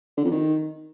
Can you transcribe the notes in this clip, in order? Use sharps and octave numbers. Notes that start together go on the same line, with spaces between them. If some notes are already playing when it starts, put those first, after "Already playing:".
D3
F2
D#3